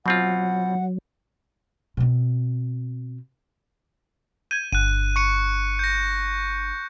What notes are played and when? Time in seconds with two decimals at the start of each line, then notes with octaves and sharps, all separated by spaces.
0.06 B2 F#3 C4 F4 F#5
1.97 B2 C4
4.51 G6 G#6 D#7
4.72 G1 F#6 D#7
5.16 C#6 C#7 D#7
5.79 G6 A#6